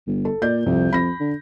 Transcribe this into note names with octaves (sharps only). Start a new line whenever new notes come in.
G1
A4
A#2 D5 G6
C2 F2
F2 B5 A#6
D3